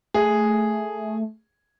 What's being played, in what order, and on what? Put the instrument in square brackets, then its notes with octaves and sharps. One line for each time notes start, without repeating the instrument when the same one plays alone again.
[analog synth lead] A3 [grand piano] G#4